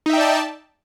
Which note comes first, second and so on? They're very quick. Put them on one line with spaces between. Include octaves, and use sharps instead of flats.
D#4 E5 G5 D5 A5